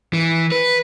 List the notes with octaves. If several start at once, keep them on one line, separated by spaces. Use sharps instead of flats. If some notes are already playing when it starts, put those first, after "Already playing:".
E3
B4